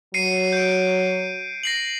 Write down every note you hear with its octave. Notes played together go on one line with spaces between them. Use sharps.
F#3 C7 C#7 D#7
G6 D7
A#6 C7 F#7